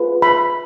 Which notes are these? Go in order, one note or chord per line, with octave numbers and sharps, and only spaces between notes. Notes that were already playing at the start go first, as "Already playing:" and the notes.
Already playing: F4 G#4 B4
B5